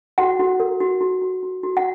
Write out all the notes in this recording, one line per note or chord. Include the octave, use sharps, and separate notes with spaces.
F#4 F#5
F#4
A#4
F#4
F#4
F#4
F#4
F#4
F#5